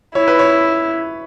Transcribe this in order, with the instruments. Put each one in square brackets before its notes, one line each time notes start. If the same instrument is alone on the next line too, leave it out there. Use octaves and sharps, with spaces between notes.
[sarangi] E4 [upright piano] C#5
[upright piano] B4
C#5